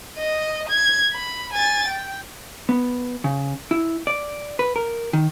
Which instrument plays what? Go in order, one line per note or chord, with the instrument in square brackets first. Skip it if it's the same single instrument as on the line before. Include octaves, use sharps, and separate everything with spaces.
[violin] D#5
G#6
B5
G#5 A6
G5
[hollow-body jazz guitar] B3
C#3
E4
D5
B4
A#4
D#3